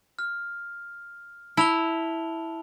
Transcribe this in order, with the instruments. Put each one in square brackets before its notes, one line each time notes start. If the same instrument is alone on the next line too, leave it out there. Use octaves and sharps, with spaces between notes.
[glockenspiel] F6
[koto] E4 [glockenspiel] A5 F7 G7